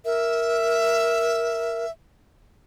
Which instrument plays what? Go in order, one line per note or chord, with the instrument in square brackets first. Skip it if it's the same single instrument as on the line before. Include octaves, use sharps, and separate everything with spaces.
[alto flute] A#4 [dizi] E5